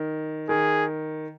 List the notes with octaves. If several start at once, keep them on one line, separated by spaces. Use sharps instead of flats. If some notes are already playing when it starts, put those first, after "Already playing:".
Already playing: D#3
D#3 G#4